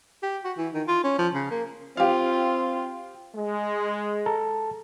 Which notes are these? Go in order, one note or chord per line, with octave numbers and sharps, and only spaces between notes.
G4
F#4
E3
D#3
F4
C#4
F3
C#3
A#3
C4 F4 G4 F5
G#3
A4 A5 A#5